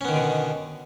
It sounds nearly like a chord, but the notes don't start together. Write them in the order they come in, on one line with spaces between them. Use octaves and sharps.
C#4 B3 D#3 D3 B2